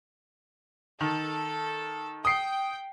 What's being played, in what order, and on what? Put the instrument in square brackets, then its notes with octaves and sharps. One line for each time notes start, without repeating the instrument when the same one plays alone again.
[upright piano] D#3 [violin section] A4
[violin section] G5 [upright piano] D#6 C7